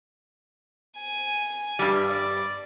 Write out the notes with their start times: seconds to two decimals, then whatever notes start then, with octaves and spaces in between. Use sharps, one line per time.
0.99 G#5
1.79 G2 G3
2.08 D5